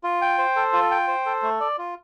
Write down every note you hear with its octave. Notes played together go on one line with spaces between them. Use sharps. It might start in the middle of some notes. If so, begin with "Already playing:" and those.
F4
G5
C5
A4
F4
G5
C5
A4
A3
D5
F4